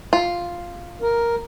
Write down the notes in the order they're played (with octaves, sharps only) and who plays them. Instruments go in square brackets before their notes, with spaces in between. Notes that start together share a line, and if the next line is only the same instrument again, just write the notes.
[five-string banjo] F4
[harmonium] A#4